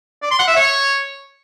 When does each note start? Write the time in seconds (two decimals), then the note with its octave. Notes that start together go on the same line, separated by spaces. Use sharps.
0.22 D5
0.30 C6
0.39 F#5
0.47 E5
0.56 C#5